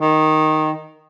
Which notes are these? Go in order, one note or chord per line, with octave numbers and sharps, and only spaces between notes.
D#3